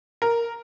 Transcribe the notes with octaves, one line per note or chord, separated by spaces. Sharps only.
A#4